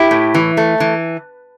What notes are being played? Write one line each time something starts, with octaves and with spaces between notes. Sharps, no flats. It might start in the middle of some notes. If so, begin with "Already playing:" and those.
Already playing: E4 G4
A2
E3
A3
E3